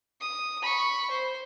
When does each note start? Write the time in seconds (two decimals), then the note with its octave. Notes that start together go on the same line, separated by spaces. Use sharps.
0.21 D#6
0.62 B5 C#6
1.11 C5